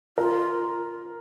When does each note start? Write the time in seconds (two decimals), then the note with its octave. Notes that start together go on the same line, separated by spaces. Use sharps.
0.18 F4 A#4